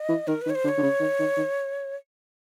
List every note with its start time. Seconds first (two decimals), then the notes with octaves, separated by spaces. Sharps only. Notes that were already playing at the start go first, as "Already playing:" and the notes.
Already playing: D#5
0.09 E3
0.27 D#3 A#4
0.42 D#3 B4
0.50 C#5
0.55 C5
0.64 D3
0.68 C#5
0.78 D3
0.83 C#3
1.00 D#3
1.20 D#3
1.37 D#3